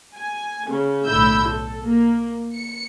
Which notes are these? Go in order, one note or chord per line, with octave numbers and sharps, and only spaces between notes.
G#5
C#3
B1 A2 D3 E4 E6 G6
A4
A#3
C#7